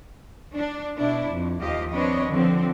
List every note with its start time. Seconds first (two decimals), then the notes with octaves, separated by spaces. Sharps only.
0.56 D4
0.97 B2 D4 E4
1.28 F2
1.60 D#2 F3 G4 D#5 F5
1.92 C4 D4 B4 C#5 D#5
2.30 D3 F3 C4